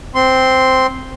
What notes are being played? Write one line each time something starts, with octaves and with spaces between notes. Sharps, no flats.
C4 C6